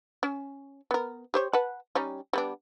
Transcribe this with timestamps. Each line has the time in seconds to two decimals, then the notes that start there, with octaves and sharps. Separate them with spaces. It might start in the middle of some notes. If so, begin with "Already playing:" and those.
0.23 C#4
0.91 B3 A#4
1.34 G4 C5 C#5
1.53 B4 F#5 A5
1.95 G3 C#4 D#4
2.33 G3 B3 D4